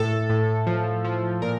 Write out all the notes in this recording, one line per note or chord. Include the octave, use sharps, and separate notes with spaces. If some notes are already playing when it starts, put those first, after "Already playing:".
Already playing: A2 A4
A2
F3
F3
A#2 A#4